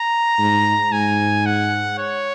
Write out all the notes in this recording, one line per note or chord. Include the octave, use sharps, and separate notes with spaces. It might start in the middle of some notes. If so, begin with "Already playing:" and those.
Already playing: A#5
G#2
G#2 G#5
F#5
C#5